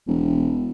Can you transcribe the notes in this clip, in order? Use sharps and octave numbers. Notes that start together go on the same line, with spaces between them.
E1